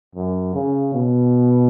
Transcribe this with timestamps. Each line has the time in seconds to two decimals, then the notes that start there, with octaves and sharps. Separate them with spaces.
0.15 F#2
0.54 C#3
0.94 B2